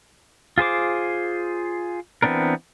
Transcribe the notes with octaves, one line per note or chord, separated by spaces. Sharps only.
F4 G#4 C5 D6
E3 B3 C4 D4 A#4